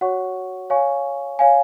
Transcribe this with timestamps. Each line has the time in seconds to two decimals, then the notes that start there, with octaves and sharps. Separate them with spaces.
0.01 F#4 C#5 F#5 C#6
0.70 C#5 F5 G#5 C#6
1.39 C#5 F5 G#5